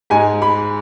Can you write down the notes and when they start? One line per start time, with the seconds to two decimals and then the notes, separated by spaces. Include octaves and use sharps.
0.10 G#2 G#3 G#5
0.42 B5